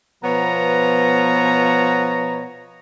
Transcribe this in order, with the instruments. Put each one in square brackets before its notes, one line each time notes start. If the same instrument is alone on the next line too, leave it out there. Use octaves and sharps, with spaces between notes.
[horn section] B2 F3 B3 C#5 A#5